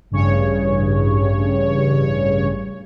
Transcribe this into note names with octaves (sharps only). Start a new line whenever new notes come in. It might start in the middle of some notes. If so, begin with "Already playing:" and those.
A1 G2 C#3 C#5